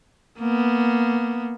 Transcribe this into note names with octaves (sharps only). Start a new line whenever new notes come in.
A#3 B3